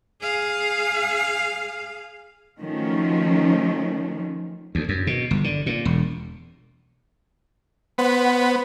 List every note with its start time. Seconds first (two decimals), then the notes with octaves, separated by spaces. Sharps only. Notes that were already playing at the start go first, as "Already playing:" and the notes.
0.21 G#4 F5
2.60 D#3 F3 F#3 A3 C#4
4.75 D2
4.89 F#2
5.07 B2
5.31 G1
5.44 D3
5.66 A#2
5.85 E1
7.98 B3 C5 F#5